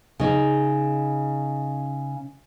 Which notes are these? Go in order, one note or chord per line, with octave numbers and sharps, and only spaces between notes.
C#3 D#4